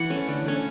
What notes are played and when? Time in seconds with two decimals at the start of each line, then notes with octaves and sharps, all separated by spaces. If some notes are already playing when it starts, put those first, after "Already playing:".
Already playing: E3 F#5
0.10 A3 C#4
0.28 D3
0.45 A3 C#4